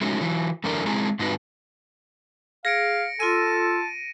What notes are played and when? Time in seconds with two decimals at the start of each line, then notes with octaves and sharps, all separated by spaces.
0.01 G#3 A3 C#4 D#4 F#4
0.21 E3 F#3
0.64 F#2 D3 E3 A3 D4 A#4
0.86 G#3 C4 E4 G#4 A#5
1.19 G#2 C4 D#4 F#4 B4
2.65 G#4 F5 A#6 C#7 D7
3.20 F4 A4 A5 C6 E6 D#7